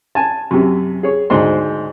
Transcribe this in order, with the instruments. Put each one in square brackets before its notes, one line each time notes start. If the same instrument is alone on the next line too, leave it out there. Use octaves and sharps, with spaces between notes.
[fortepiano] G#5 A5
F#2 C3
G#4 C#5
D2 G#2 D#4 C5 C6